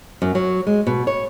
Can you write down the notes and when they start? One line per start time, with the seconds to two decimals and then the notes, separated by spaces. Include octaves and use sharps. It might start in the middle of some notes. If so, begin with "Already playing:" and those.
0.22 F#2
0.35 F#3
0.67 G#3
0.87 B2
1.07 C#5